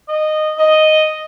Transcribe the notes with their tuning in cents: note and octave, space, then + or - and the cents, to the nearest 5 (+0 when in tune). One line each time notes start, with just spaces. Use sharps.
D#5 -15
D#5 +0